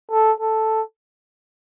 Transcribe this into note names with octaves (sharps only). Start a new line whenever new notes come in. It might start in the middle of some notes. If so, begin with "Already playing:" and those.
A4
A4